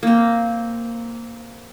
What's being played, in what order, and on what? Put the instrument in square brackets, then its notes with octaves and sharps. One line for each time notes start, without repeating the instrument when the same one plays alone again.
[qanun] A#3 C4